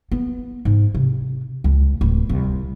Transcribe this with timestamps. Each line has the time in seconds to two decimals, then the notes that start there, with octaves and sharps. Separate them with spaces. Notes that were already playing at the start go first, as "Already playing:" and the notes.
0.12 B3
0.65 G#2
0.95 C3
1.64 C#2
2.01 D1
2.29 C2